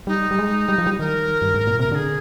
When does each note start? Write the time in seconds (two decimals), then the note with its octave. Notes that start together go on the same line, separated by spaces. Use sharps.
0.07 G3 D#4
0.31 G3
0.39 G#3
0.69 G3
0.78 F3
0.87 G3
0.99 D#3 A#4
1.42 G2
1.54 G#2
1.67 A#2
1.79 C3 A#4
1.91 D3 G#4 A#4